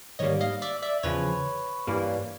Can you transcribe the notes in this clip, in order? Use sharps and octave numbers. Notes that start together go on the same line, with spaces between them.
G#2 D#3 G3 A#3 C#5 D#5
D#5 F5
D5 E5
D5 E5
E2 C#3 F3 B4 C#5
G2 E3 G3 A#3